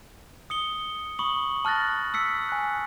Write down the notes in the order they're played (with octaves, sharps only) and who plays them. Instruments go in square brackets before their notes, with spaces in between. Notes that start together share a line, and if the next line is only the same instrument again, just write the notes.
[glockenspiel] D#6 C#7 G7
B5 C#6 D#6 F#7
A5 F6 F#6 A6 A#6
E6 B6 C#7
G#5 F#6